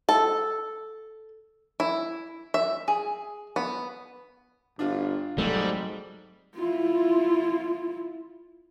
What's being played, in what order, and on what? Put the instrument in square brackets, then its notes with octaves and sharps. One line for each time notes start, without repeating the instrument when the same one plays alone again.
[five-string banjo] A4
E4
E5
G#4
B3
[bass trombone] G1 [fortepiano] D4 F4
[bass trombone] G#2 [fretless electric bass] F#3 A3 C4 [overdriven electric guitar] G3 [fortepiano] A4
[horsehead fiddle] E4 F4